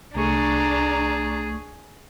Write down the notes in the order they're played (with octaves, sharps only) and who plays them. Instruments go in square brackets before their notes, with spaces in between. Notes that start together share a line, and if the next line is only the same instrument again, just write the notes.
[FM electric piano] C2 A3 C#6 [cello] D4 [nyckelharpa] G#4 [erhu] A#5